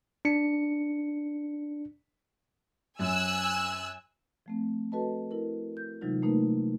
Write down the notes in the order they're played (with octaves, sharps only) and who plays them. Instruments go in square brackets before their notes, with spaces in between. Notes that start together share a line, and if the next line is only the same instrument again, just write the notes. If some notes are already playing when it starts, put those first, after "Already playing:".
[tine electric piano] D4 C#7
[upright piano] F#2 [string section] G#5 E6 F#6
[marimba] F3 A3 C4
F#4 A4 B4 D#5 A5
E4 A#4
G6
C3 E3 F#3 G#3 D#4 F4
A3 A#3 D#4 A#4 B4